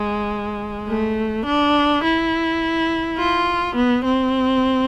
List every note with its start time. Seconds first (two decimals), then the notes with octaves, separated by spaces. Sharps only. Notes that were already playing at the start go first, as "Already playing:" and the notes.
Already playing: G#3
0.88 A3
1.46 D4
2.04 E4
3.18 F4
3.76 B3
4.05 C4